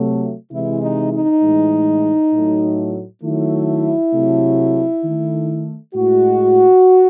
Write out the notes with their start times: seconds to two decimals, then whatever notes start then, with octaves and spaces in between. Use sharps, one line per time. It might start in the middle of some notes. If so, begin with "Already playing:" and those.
Already playing: C3 F#3 A3
0.52 C3 E3 G#3 E4
0.82 D#4
1.13 D#4
1.42 A2 E3 G#3
2.33 A2 F#3 A3
3.23 D#3 F#3 A3 E4
4.13 C3 F#3 A3
5.04 D#3 A3
5.95 A2 G#3 F#4